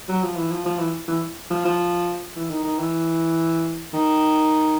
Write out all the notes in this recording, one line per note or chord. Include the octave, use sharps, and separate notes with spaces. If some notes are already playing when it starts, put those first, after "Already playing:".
F#3
F3
E3
F3
F3
E3
E3
F3
F3
E3
D#3
D#3
E3
D#3